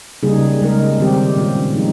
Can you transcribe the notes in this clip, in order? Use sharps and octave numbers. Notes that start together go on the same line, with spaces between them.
C#3 G3 A#3 D#4 G#4
C#3 G#3 D#4 A#4
D#3 G3 C4 G4
A#2 G#3 C#4 F4
F3 G#3 C4 D#4